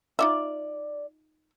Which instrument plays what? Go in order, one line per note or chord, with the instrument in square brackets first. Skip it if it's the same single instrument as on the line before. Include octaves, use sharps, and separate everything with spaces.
[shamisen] D#4 F4 E5 [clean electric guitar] D5